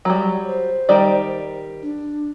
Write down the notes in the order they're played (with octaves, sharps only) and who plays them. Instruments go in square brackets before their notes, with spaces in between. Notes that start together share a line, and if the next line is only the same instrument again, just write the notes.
[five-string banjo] F#3 G3 [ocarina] C#5
[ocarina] C5
[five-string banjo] D#3 G3 D5
[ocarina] D4